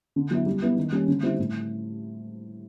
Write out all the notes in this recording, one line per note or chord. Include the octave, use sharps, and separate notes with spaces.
D3
F#3 B3 E4
G3
B3 E4
D#3
G3 A#3 C#4
D3
G3 C4 E4
A2